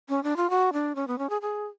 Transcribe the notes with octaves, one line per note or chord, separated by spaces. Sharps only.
C#4
D4
F4
F#4
D4
C#4
B3
C#4
G#4
G#4